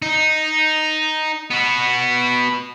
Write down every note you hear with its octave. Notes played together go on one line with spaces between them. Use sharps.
D#4
B3 F#4